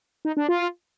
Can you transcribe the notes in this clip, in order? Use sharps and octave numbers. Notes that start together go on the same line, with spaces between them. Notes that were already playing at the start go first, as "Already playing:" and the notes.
D#4
D4
F4